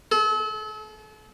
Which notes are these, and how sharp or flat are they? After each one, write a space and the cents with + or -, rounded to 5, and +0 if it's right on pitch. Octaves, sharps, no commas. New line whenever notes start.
A4 -40